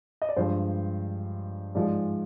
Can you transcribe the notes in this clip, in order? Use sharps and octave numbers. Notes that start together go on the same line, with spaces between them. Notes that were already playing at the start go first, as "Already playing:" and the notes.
D#5
D5
G2 F3 G#3 C5
G#2 F3 G#3 D5